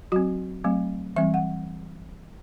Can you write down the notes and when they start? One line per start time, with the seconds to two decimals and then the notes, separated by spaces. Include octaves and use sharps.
0.12 F#3 C4 F#4
0.64 F#3 A3 C4
1.16 E3 G3 C4 E5
1.34 F#5